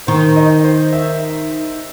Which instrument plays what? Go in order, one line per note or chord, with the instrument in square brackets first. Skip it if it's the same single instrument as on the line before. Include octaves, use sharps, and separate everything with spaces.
[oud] D#3 [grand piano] C5
[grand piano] D#5
C5
E5